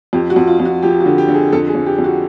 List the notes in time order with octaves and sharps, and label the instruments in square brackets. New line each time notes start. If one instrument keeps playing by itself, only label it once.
[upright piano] F2 G4
F#4
F2
F4
F2
F#4
F3 G4
F#4
D3
G4
D3
G#4
F2 A4
G#4
F2
G4
F2
F#4